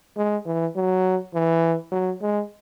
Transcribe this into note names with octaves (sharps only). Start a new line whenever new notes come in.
G#3
E3
F#3
E3
F#3
G#3